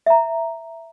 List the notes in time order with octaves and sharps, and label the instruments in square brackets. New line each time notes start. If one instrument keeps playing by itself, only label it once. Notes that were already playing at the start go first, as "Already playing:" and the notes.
[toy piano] E5 A#5